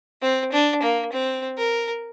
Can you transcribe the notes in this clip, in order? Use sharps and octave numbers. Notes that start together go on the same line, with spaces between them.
C4
D4
A#3
C4
A#4